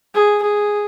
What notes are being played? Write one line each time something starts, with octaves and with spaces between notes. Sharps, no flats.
G#4
G#4